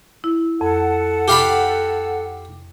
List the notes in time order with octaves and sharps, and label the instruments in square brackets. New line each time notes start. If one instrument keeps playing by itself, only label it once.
[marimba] E4
[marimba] F2 [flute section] A4 F#5
[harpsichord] G4 F5 B5